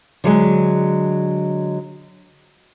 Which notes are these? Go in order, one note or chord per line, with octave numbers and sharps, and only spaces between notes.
D3 F#3 G#3